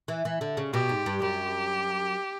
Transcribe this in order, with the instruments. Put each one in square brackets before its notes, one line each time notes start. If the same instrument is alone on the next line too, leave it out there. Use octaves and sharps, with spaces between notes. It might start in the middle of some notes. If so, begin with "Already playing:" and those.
[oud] E3
E3
D3
C#3
[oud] B2 [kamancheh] G4
[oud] G#2
G2
[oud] F#2 [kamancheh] G4